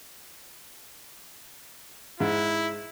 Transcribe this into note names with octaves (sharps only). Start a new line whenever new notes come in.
G#2 E4